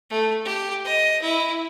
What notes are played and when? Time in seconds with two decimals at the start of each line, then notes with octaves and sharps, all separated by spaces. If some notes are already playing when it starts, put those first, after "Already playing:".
0.10 A3
0.45 G4
0.85 D#5
1.22 E4